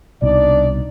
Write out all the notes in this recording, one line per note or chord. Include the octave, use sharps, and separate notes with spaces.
C2 B2 D4 D#4 D5